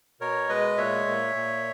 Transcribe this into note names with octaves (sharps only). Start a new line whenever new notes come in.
B2 A#4 C#5
G#3 B4 D#5
A#2 C#5 E5
A#2
A#2